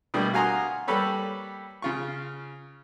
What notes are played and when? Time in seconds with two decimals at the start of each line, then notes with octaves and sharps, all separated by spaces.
0.14 B2 D3 G3 A3 A#3
0.34 F#4 F5 G#5 A#5 C6 D#6
0.88 G3 A#3 G4 A4 B4 C#5
1.82 C#3 F4 C#6